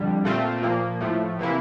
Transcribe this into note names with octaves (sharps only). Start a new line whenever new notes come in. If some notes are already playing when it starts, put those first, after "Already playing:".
Already playing: F2 D3 G3
A#2 A3 C4 F4
A#2 F3 A#3
A2 F3 A3
C3 E3 A#3 E4